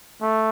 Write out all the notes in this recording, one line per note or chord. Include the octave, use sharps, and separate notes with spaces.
A3